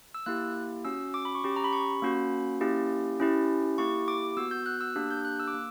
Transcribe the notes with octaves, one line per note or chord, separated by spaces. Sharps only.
E6
A#3 E4 G4 F#6
C#4 F#4 E6
D6
B5
C#6
C#4 G4 D6
A#5
B5
C#6
A#3 C#4 F#4 B5
A#3 C#4 E4 G4
C#4 E4 G4
A#3 E4 G4 C#6
D6
B3 F#4 E6
G6
F#6
E6
A#3 D4 G4 F#6
G6
F#6
E6
D6
A#3 E6